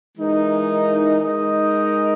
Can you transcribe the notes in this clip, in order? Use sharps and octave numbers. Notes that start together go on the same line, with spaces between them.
E3 G#3 D#4 A#4
G#3 D#4 A#4 D#5